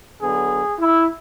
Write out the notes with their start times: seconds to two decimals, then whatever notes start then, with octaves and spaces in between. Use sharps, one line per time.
0.21 D3 F#3 B3 G#4
0.80 E4